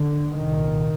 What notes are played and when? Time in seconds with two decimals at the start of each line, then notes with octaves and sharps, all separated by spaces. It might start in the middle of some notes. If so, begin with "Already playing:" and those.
Already playing: D3
0.37 C2 A#2 D#3